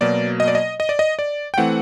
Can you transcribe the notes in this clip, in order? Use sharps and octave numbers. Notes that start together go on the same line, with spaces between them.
B2 F#3 A#3 D5
D#5
D5
D#5
D#5
D5
D#5
D5
G5
E3 A3 C4 F#5